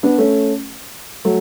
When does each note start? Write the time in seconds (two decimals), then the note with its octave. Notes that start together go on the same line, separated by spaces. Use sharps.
0.03 B3 D4
0.18 A3 C#4
1.25 F#3 A3